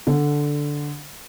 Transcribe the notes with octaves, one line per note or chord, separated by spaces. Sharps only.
D3